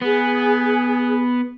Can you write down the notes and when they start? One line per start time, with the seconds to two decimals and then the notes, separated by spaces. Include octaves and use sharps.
0.01 B3 G#4